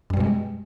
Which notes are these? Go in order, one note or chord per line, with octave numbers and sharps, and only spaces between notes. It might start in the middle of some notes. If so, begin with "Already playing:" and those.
F#2 B2 G3 G#3